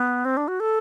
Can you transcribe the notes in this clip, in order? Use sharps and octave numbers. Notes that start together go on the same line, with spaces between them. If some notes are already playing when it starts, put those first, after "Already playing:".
Already playing: B3
C4
D4
F#4
A4